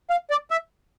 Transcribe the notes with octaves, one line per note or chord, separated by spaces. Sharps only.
F5
D5
E5